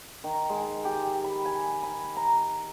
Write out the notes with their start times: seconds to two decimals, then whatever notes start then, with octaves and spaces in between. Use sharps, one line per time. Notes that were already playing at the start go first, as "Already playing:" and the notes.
0.24 D#3
0.50 G#3
0.85 G4
1.24 B5
1.45 G#5
1.83 B5
2.17 A#5